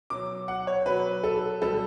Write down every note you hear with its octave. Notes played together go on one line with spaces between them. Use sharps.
B2 F#3 D6
F#5
C#5
B2 F#3 B4
A4
B2 G3 A4